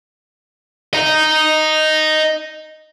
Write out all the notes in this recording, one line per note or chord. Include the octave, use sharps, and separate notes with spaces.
D#5 A#5